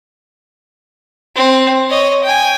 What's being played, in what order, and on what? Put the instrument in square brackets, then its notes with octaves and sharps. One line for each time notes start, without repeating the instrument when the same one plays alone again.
[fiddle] C4
C#5 D#5
G5 G#5